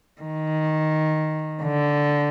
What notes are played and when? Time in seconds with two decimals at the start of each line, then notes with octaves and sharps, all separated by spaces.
0.22 D#3
1.63 D3